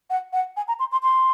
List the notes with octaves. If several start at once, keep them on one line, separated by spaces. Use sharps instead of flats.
F#5
F#5
G#5
A#5
C6
C6
C6